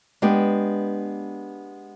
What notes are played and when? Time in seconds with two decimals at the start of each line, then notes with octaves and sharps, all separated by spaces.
0.22 G#3 B3 D4 G4 B4